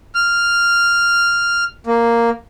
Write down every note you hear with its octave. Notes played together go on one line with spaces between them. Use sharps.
F6
A#3